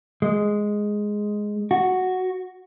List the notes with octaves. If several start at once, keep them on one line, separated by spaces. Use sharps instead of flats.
G#3
F#4